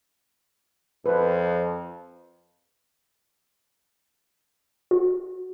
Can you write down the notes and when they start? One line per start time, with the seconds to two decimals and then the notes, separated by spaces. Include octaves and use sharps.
1.06 F2 B4
4.91 F#4